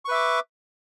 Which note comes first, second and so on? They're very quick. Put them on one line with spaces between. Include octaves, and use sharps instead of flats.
C#6 B4 E5 D6